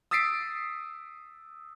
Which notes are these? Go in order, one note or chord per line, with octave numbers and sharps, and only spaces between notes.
D#6 E6 A6 B6 C7 D7